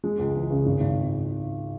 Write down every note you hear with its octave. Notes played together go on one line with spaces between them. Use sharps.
G#3
C#2
E3
C#3
G#1
G#1